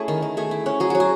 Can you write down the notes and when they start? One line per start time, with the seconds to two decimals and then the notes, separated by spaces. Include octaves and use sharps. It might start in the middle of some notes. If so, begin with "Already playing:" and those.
Already playing: A3 C#4 E4 G#4
0.08 D#3
0.22 D#3
0.37 A3 G#4
0.51 E4
0.66 C#4
0.80 F#3 G#4
0.90 F#3 F#4
1.00 G#4